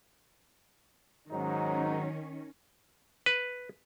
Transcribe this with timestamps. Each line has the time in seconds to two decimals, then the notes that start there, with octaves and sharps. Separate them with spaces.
1.30 G#2 D#3 F#3 C#4 D#4
3.26 B4